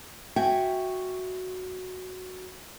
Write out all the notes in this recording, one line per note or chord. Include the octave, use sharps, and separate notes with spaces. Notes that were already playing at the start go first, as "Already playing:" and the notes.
F#4 E5 G5 G#5